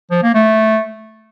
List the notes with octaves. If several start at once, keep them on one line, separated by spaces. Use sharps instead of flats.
F3
A#3
A3